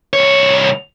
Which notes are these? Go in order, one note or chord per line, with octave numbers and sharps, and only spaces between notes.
C2 C#5